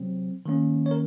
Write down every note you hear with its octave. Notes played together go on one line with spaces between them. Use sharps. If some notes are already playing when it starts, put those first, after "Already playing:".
Already playing: C3 F#3 C4
D#3 A#3 C#4
C#5
A#4